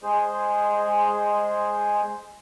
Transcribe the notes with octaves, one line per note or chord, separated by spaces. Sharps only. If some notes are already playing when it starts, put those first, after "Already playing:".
G#3 G#4 C5